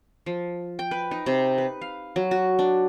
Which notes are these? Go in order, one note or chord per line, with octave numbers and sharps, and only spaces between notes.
F3
G5
B4
D#4
C3
B4
F5
F#3
F#4
D4